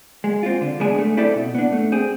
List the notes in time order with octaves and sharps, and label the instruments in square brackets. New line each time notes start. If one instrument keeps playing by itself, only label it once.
[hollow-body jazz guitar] G#3
C4 F4
D3
G#3 B3 D4 G#4
A3
C4 E4 A4 D5
B2
B3 D4
A3
C4 G#4